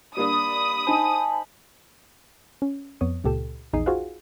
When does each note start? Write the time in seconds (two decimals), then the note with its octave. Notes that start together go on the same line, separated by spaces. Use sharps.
0.17 G3 A#3 D4 B5 D#6
0.87 D#4 C5 G#5 A5
2.62 C#4
3.01 F2 B3 C#5 D#6
3.24 C#2 A#2 G4 A4 E7
3.73 A#1 E2 D#4 G#4 D#6 C7
3.86 F4 F#4 G#4 C5 F5 F#5